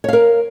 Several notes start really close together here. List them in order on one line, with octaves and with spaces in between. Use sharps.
C#5 F5 A#4